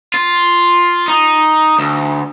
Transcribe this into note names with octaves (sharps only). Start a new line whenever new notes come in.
F4
D#4
D2